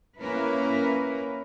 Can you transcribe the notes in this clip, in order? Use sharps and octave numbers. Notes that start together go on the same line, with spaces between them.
A#3 C#4 E4 A#4 B4